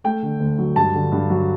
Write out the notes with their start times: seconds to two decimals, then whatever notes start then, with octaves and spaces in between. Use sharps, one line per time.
0.04 A3 G5
0.22 D3
0.40 D2
0.58 F#3
0.76 G2 A5
0.95 D3
1.12 G2
1.30 F#3